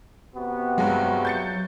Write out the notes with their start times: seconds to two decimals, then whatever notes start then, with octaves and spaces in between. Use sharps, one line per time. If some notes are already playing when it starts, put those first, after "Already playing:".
0.36 C3 B3 F#4
0.78 G2 F#3 G#3
1.25 G6 A6 C#7